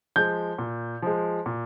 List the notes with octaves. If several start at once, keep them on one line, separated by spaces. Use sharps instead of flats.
F3 G#3 G6
A#2
F3 G#3
A#2